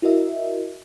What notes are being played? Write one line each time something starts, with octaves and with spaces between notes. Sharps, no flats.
E4 F#4 A#4 D#5 E5